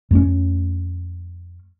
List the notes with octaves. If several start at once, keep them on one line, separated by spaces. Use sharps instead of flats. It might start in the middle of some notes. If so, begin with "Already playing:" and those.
F2 A3 C#4